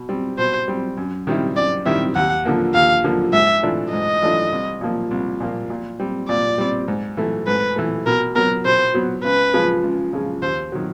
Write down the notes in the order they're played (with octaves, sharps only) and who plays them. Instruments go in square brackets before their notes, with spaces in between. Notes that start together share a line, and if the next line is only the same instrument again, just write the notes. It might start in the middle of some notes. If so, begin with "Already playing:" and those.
Already playing: [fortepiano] B2
G3 C4
[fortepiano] B2 [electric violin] C5
[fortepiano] G3 C4
F#2
D#3 G3 C4 E4
[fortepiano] F#2 [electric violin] D5
[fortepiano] D#3 G3 C4 E4 [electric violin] E5
[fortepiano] D#2 [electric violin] F#5
[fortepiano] D3 F3 A#3
[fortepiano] D#2 [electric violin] F5
[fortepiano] D3 F3 A#3
[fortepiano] G#2 [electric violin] E5
[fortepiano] E3 A3 D4 F4
[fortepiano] G#2 [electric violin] D#5
[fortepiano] E3 A3 D4 F4
C2
A#2 F3 A#3
C2
A#2 F3 A#3
A#2
G3 C4
[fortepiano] A#2 [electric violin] D5
[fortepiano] G3 C4
G#2
E3 A3
[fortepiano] G#2 [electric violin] B4
[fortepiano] E3 A3
[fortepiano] B2 [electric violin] A#4
[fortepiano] F#3 B3 [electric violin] A#4
[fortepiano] B2 [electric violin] C5
[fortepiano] F#3 B3
[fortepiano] C#2 [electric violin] B4
[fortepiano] C#3 F3 G#3
C#2
C#3 F3 G#3
[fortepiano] D#2 [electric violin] C5
[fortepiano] D#3 F#3